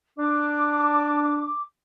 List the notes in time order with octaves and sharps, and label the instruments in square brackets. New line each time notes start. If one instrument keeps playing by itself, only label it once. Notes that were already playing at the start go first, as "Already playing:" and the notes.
[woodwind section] D4 [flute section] D6